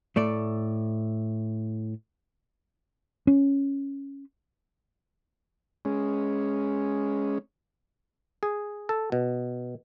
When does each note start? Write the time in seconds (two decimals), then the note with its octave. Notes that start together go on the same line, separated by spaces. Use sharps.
0.16 A2 A3 D5
3.27 C#4
5.85 G#3 C#4
8.43 G#4
8.89 A4
9.12 B2